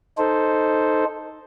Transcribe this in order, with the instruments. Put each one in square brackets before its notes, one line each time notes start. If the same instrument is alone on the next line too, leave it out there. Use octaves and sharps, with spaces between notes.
[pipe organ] D#4 A4 C5